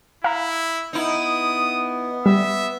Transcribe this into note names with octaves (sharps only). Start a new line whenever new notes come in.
E4 F5 A#5
B3 D#4 E4 D#6
G3 E5